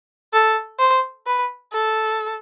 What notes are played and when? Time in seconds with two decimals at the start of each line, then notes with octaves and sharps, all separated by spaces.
0.33 A4
0.80 C5
1.27 B4
1.73 A4